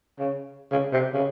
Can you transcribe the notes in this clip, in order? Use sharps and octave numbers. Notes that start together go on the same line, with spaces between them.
C#3
C#3
C3
C#3